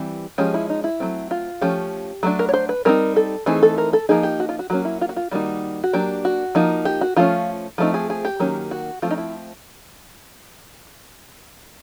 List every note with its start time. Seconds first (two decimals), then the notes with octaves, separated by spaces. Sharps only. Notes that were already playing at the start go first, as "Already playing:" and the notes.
Already playing: E3 G3 C4
0.38 F3 G#3 C#4 G4
0.54 E4
0.70 D#4
0.84 E4
1.00 F#3 A3 C4
1.31 F4
1.61 F3 A3 C#4 G4
2.23 F#3 A3 D4
2.39 A#4
2.49 C#5
2.54 C5
2.69 B4
2.85 G3 C4 D#4 A#4
3.16 A4
3.46 E3 A3 C4 D#4 G#4
3.63 A4
3.78 A#4
3.93 A4
4.09 F3 A#3 D#4 G#4
4.23 G4
4.40 F#4
4.49 F4
4.59 F#4
4.70 F#3 A#3 C#4 F#4
4.85 E4
5.01 F4
5.09 F#4
5.16 F4
5.31 D#3 G3 A#3 D#4 F#4
5.84 F#4
5.93 F#3 A#3 D4 G4
6.25 F#4
6.55 F3 A#3 D#4
6.85 G4
7.01 F#4
7.16 F3 A3 C#4 F4
7.78 F3 A3 C4 D#4
7.94 G#4
8.10 G#4
8.25 G4
8.40 D#3 F#3 A#3 C#4
8.71 F#4
9.02 F3 A3 C4 F4
9.11 D#4
9.18 E4